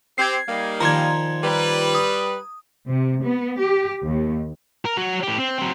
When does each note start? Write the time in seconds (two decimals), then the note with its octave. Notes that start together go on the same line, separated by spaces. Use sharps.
0.18 C4 G4 G#6 C7
0.48 G3 A#3 D#4
0.80 A#2 D#3 F3 A#5 C6 G#6
1.43 G3 B4
1.95 D#6
2.87 C3
3.23 B3
3.59 G4
4.05 D#2
4.85 A#4
4.97 F#3 F#4
5.23 A2 G4
5.38 C4
5.59 F#3 C4